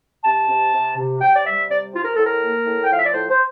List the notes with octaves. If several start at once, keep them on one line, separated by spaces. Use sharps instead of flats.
C3 A5
C3
C3
C3
C3 G5
D5
G3 E5
C3 D5
C4 F4
A#4
A2 A4
A#4
A#3
A2
G5
F3 F5
E5
D5
A2 C5
C5